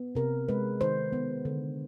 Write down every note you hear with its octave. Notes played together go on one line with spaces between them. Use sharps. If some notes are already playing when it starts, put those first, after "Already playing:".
Already playing: B3
C3 A#4
G#3 B4
D#3 C5
B3
D3